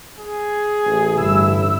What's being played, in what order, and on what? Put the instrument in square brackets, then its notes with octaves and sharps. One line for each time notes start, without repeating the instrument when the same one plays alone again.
[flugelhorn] G#4
[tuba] A1
[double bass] G1 E4 [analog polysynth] E6